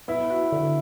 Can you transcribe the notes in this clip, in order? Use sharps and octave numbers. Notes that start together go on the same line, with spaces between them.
B3 E4
F#4
D3